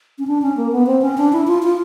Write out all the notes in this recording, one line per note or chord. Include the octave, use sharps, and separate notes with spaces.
C#4
D4
C#4
A#3
B3
C4
C#4
D4
E4
F4
F4